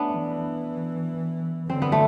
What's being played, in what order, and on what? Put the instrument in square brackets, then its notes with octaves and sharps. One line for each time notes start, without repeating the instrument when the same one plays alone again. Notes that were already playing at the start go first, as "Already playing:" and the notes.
Already playing: [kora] A3 B3 D4
[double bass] E3
[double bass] D3 [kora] C4
[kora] B3
A3